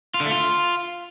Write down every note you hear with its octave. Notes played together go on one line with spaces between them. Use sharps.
F4
D3
A3
F4